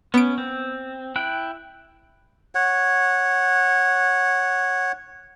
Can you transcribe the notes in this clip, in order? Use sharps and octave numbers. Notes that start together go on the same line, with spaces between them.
B3 C#4 D7
C4
E4 G5 F#6
C#5 F#5